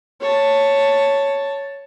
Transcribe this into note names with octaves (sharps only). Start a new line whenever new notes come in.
C#5 A5